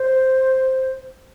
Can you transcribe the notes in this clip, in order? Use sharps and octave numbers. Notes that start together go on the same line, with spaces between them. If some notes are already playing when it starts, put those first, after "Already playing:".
Already playing: C5